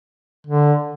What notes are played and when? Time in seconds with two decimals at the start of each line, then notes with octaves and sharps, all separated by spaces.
0.47 D3